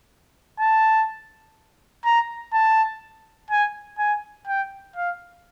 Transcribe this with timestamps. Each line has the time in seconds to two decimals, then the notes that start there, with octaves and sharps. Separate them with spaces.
0.60 A5
2.05 A#5
2.53 A5
3.50 G#5
3.99 G#5
4.47 G5
4.96 F5